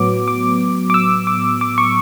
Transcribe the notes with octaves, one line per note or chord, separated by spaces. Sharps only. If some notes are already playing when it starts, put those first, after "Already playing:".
Already playing: A2 F#3 B3 D6
D6
D6
E6
D6
D6
C#6